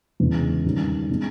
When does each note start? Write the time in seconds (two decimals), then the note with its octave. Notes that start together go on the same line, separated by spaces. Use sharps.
0.20 E2 C#3 G#3
0.65 G2 D#3 G3 C#4
1.09 C#3 G#3 B3